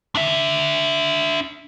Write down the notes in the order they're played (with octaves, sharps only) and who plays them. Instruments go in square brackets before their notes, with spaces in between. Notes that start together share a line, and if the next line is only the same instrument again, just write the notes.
[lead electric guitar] D4 E5